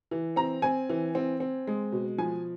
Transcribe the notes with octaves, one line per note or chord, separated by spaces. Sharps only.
E3
C4 A#5
C4 G#5
E3
C4
C4
G#3
B2
F3 G#5